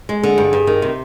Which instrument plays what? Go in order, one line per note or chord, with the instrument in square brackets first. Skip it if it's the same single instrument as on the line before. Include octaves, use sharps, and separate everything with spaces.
[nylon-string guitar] G#3
[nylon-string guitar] D3 [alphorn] G#4
[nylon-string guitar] G2
G2
D#3
C3